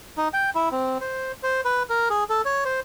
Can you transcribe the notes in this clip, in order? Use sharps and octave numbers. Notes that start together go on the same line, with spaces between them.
D#4
G5
E4
C4
C5
C5
B4
A#4
G#4
A4
C#5
C5